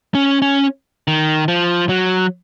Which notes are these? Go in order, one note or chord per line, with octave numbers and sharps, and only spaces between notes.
C#4
C#4
D#3
F3
F#3